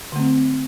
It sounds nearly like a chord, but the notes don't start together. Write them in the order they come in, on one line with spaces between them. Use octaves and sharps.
D3 A3 C4